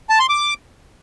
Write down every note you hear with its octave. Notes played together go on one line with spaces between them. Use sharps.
A5
C6
D6